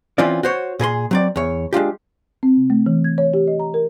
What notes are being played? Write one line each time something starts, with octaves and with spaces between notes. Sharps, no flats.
E3 C4 C#4 F4 D5
F#4 C5 C#5
A#2 G#4 A#4 C6
F#3 C4 D5
E2 C#5
G#3 D4 F4 G4
C4
C3
A3
E3
G#6
C#5
G4
D#5
A#5
A#4